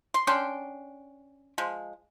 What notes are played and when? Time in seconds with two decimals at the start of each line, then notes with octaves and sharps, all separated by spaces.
0.14 C6
0.27 C#4 D4 G5 C6
1.58 F3 G#3